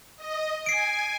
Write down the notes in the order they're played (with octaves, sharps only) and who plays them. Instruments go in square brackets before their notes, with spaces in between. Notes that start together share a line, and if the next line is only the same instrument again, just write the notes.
[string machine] D#5
[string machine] G#5 [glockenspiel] C7 D7